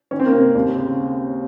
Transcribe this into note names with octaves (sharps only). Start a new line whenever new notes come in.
D#3 C#4
C4
A#3
C3 C4
D#2
C#3